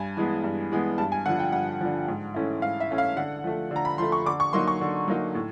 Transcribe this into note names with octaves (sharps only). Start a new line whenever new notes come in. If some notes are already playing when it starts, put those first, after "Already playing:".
Already playing: G2 G#5
E3 G#3 B3
G2
E3 G#3 B3
G2 A5
G#5
D3 F3 F#5
G5
G2 F#5
D3 F3
G#2
E3 A3 C#4 E4
G#2 F5
E5
E3 A3 C#4 E4
F5
D3 F#5
F3 A3
D3
A#5
B5
F3 A3 C6
C#6
D3 D6
C#6
F#3 A#3 D#4 C6
C#6
D3
F#3 A#3 D#4
A2